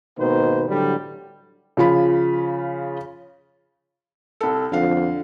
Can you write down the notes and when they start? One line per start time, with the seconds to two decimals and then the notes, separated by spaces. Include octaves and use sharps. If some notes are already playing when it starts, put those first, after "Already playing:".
0.18 G#1 B2 D#3 A#3 B4 C5
0.68 A2 D3 F#3 G3
1.77 C#3 F3 F4 B5
4.41 C2 A4
4.72 F2 D3 F5